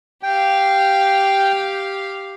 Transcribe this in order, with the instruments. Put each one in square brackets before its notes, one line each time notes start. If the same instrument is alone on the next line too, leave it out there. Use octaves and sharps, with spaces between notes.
[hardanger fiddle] G4 F5 [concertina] G5